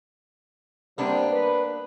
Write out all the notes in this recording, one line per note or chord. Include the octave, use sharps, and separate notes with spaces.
C3 G3 A#3 B3 D4 C5
B4